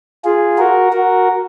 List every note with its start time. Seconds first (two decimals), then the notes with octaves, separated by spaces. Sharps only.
0.24 F4 G#4
0.58 F#4 A#4
0.93 F#4 A#4